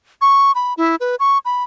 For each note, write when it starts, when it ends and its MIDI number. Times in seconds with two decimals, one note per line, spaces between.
0.21 0.52 85
0.55 0.74 83
0.77 0.96 64
1.00 1.15 71
1.20 1.38 85
1.45 1.63 83